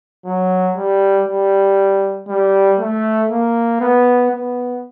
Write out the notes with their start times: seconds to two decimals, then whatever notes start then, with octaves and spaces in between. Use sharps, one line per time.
0.26 F#3
0.76 G3
1.27 G3
2.28 G3
2.79 A3
3.30 A#3
3.81 B3
4.31 B3